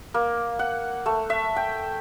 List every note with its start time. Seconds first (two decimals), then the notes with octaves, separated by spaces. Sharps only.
0.14 A#3
0.59 F#5
1.06 A3
1.30 E5
1.56 G5